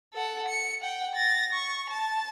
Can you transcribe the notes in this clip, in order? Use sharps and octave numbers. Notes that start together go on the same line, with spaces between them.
A4 F#5
C#7
F#5 G5
A6 A#6
C#6
A5